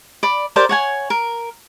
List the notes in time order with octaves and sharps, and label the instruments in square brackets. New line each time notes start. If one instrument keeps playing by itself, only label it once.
[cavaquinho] D5 B5
G4 A#4 C5 D5
C#5 F#5 G#5
A#4